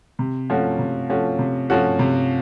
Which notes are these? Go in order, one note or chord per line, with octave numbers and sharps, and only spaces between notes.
C3
F3 A3 C#4 F#4
C3
F3 A3 C#4 F#4
C3
F3 A3 C#4 F#4
C3